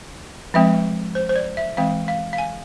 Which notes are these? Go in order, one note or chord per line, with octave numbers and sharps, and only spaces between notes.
F3 G#3 C4 E5
C5
C5
D5
E5
E3 G#3 C4 F5
F5
F5
G#5